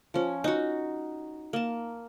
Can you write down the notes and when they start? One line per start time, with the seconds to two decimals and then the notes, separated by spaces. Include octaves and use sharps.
0.14 F3 C#4
0.44 D#4 F#4
1.53 A#3 A5